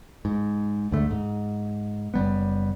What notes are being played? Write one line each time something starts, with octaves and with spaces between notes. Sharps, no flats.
G#2
D2 G#2 D3 A3
G#2
F#1 G3 B3